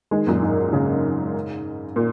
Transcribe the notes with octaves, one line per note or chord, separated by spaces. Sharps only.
D#3 G#3
F#2 A#2
G#2
G#2 C#3
A#2